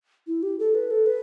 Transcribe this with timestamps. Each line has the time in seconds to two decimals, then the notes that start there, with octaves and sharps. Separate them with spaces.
0.27 E4
0.43 G4
0.59 A4
0.74 B4
0.90 A4
1.06 B4